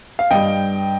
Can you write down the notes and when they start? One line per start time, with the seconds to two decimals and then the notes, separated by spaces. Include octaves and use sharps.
0.19 F5
0.31 G2 G3 D#5 G5